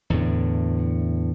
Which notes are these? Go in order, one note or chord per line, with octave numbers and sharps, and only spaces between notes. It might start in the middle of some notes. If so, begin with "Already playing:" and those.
E2 A2 D3